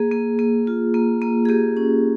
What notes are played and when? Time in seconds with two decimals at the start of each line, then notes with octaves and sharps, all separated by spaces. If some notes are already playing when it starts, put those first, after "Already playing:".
Already playing: A#3 G#4
0.12 A#3
0.39 A#3
0.67 F4
0.94 A#3
1.22 A#3
1.45 G#4
1.49 A#3 G4
1.77 C#4